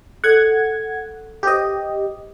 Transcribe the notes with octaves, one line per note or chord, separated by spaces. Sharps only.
A4 C#5 D#5 F#5 G#6
G4 B4 C5 D#5